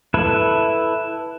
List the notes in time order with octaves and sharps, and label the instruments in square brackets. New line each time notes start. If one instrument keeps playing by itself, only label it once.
[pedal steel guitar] E4 A4 B4 E5